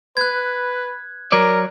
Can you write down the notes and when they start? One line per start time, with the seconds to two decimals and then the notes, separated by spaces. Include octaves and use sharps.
0.17 B4 F#6 G#6
1.32 F#3 A#4 C#5 D5